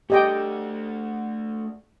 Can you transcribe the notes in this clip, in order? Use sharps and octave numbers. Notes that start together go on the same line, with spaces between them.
A3 D4 G4 D#5 G5